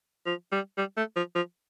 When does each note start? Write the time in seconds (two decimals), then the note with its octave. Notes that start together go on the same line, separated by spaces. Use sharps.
0.26 F3
0.52 G3
0.78 G3
0.97 A3
1.16 F3
1.36 F3